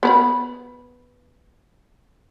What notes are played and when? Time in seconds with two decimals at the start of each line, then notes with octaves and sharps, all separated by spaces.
0.03 B3 B4 B5